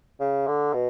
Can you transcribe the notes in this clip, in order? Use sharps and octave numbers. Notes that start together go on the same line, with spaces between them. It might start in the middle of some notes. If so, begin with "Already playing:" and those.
C#3
D3
B2